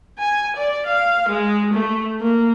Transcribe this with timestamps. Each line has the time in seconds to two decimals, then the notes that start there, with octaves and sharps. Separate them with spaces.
0.18 G#5
0.56 D5
0.87 F5
1.29 G#3
1.73 A3
2.21 A#3